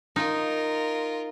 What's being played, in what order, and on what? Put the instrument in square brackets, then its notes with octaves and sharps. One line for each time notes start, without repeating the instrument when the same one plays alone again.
[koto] D#4 [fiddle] F4 A#4